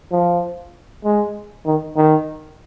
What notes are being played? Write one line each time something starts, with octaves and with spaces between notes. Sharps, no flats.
F3
G#3
D#3
D#3